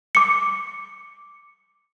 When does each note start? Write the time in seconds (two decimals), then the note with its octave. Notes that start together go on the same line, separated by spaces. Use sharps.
0.15 D6 C#7